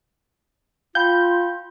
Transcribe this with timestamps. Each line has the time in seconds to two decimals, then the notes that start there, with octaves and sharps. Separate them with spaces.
0.95 F4 F5 G5 B5 G6